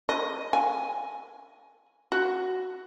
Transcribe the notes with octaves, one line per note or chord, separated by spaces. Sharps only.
D#5
G#5
F#4